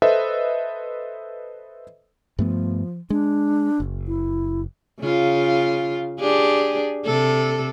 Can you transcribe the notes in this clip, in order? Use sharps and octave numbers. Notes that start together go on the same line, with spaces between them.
A4 B4 C5 D#5 E5
G2 F3 A3 B3
G#3 D4
F#1
E4
C#3 F4
D4 G4 G#4
C3 A4